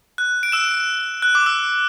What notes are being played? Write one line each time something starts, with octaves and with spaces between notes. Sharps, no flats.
F#6
D7
E6 E7
F#6
D6
E6